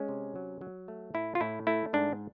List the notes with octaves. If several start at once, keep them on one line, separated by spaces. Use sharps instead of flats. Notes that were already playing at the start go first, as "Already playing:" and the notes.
Already playing: G#3 C#4
C3
F#3
F#3
A3
A2 E4
F4
A2 E4
A3 E4
G#2 D4